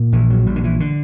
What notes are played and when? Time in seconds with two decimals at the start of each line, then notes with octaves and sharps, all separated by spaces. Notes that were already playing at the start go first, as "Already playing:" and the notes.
Already playing: A#2
0.12 A#1 E3
0.30 F#3
0.46 A#1 G3
0.56 D3
0.64 E3
0.80 D3